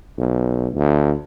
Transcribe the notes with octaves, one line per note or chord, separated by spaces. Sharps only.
B1
D2